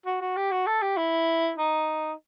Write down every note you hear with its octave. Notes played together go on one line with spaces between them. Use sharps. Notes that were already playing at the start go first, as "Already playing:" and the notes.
F#4
F#4
G4
F#4
A4
G4
E4
D#4